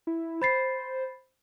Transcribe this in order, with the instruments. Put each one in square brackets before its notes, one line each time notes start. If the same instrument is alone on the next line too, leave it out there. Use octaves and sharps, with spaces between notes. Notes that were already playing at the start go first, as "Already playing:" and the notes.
[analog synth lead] E4
[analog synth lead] C5 [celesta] B5 A6 C7